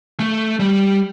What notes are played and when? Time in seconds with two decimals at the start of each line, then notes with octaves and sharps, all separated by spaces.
0.20 A3
0.60 G3